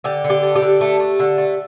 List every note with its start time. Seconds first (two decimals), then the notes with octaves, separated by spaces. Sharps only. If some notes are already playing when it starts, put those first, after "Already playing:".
0.04 D3 G4
0.24 D3
0.30 G4
0.43 A3
0.55 G4
0.62 D3
0.81 A3
1.00 A3
1.20 D3
1.38 A3